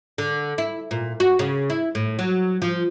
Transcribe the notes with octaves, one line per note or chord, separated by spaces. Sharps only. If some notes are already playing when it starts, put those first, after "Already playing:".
D3
E4
A#2
F#4
C#3
E4
A2
F#3
F3